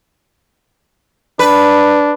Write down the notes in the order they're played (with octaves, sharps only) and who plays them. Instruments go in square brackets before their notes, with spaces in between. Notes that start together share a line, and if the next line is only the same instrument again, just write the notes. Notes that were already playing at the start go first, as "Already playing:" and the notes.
[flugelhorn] D4 [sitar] B4